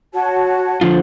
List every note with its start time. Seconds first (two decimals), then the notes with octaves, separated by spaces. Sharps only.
0.14 F#4 C#5 A5
0.81 D3 F3 F4 C5